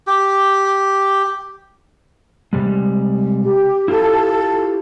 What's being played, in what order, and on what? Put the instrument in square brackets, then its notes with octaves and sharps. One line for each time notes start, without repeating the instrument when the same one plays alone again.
[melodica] G4
[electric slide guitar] C3 G3 G#3
[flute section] G4
[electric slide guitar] E4 F4 G4 [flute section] A4